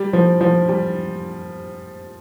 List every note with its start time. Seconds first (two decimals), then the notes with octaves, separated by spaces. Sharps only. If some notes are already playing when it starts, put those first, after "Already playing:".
Already playing: G3
0.13 F3
0.41 F3
0.69 G3